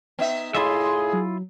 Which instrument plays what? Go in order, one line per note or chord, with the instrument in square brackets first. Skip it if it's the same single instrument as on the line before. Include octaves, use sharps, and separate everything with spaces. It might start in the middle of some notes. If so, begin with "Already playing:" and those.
[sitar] B3 D#4 E5
[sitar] A2 D#5 [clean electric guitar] E4 F4 E5 [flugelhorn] G#4 [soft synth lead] C6
[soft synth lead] F#3